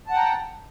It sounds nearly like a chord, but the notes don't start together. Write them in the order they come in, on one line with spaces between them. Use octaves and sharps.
A5 F#5 G5 A#5